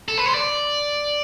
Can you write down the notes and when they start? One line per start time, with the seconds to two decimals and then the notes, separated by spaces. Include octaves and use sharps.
0.08 A4
0.17 B4
0.26 C5
0.34 D5